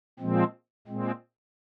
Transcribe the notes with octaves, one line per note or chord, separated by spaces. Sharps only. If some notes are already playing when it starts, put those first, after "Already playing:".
A#2 F3 G#3 C4
A#2 G#3 C4